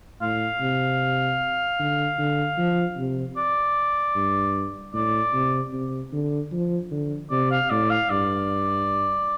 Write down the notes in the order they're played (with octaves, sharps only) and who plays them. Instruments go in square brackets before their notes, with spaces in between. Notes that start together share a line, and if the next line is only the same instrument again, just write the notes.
[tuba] A2 [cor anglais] F5
[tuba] C3
D3
D3
F3
C3
[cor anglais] D5
[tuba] G2
[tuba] A2 [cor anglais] D5
[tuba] C3
C3
D3
F3
D3
[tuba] C3 [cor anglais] D5
[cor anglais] F5
[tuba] A2 [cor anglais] D5
[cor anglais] F5
[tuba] G2 [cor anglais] D5